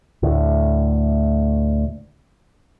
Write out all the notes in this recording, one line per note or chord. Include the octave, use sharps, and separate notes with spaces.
D2 A2